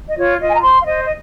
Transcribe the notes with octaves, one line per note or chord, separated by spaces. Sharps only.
D#5
F4 C#5
F4 D#5
G#5
A#5
C5 C6
F5
C5 D#5
D#5